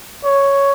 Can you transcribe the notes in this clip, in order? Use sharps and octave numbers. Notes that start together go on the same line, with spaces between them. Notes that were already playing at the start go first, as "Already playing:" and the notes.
C#5